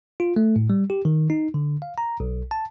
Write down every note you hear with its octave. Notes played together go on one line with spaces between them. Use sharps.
F4
A3
A2
G3
G4
D#3
D#4
D3
F5
A#5
B1
A5